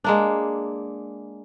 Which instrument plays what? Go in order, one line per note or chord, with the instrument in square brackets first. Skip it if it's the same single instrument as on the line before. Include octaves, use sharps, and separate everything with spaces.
[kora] G#3 A#3 D4